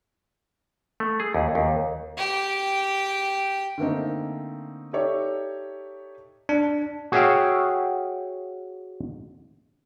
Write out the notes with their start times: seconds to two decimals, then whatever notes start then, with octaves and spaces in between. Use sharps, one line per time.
1.00 A3
1.20 G#4
1.35 D#2
1.55 D#2
2.17 G4 G5
3.78 D3 A3 A#3 C4 D#4
4.93 D#4 G4 A4 C#5 D5 E5
6.49 D4
7.12 F#4 G#4 C#5 E5 F5 G5